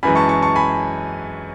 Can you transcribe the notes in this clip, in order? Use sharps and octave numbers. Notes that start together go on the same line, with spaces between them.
F#2 E3 G#3 G#5 B5
A5 C#6
A5 C#6
A5 C#6
G#5 B5